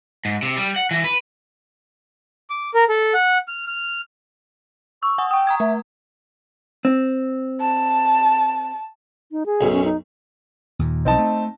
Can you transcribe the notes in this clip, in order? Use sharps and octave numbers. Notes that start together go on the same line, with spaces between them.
G#2
C3
G3
F#5
E3
B4
D6
A#4
A4
F#5
F6
F6
C#6 E6
F#5 G#5 D#6
G5 C#6 D#6
A#5 D#6 G#6
A3 E5
C4
A5
D#4
G#4
B1 F#2 B2
C#4
D#4
D#2 A#2
B1 D3 F3 C4 D#4 A5
A3